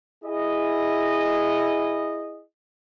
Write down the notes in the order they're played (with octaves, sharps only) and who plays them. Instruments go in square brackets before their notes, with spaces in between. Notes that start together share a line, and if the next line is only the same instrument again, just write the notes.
[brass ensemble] E4 G#4 D#5